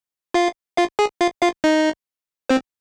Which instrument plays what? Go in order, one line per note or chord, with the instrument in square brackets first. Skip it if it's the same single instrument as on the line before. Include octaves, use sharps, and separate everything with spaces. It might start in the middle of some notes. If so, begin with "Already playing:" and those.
[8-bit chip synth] F4 F5
F4 F5
G#4 G#5
F4 F5
F4 F5
D#4 D#5
C4 C5